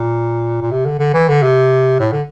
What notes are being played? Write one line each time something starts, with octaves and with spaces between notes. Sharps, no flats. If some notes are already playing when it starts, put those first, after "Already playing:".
Already playing: A#2
A#2
C3
D3
D3
E3
D3
C3
A2
D3